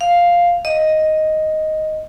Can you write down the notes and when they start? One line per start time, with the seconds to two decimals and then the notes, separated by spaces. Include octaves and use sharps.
0.01 F5
0.65 D#5